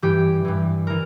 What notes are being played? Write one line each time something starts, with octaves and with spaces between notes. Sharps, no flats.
G2 E3 G4
G2 E3
E3 A#4